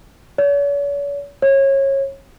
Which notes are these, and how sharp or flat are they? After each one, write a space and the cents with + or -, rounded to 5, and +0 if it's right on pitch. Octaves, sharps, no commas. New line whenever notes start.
C#5 +45
C#5 -25